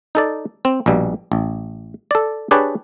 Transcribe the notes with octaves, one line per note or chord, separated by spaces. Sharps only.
D#4 A4 D5
C4
A#1 B2 G3
A1
A4 D5
D4 G4 G#4 B4 C#5 D5